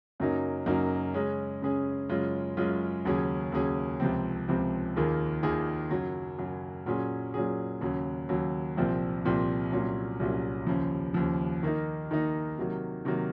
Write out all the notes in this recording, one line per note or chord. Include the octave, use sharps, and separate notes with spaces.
F#2 C#3 F#3 A#3 D#4
F#2 C#3 F#3 A#3 D#4
C#3 G#3 C#4 G#4
C#3 G#3 C#4 G#4
F#2 C#3 G#3 C#4 F4
F#2 C#3 G#3 C#4 F4
D#2 C#3 F#3 C#4 G#4
D#2 C#3 F#3 C#4 G#4
C#2 C3 F3 C4
C#2 C3 F3 C4
D#2 D#3 A#3 F4 G#4
D#2 D#3 A#3 F4 G#4
F#2 C#3 F#3
F#2 C#3 F#3
A#2 F#3 C#4 G#4
A#2 F#3 C#4 G#4
D#2 C#3 F#3
D#2 C#3 F#3
C2 A#2 F3 C4
C2 A#2 F3 C4
C2 A#2 F#3 C#4
C2 A#2 F#3 C#4
D#2 C#3 F3
D#2 C#3 F3
D#3 A#3 D#4
D#3 A#3 D#4
C3 D#3 F#3 A#3
C3 D#3 F#3 A#3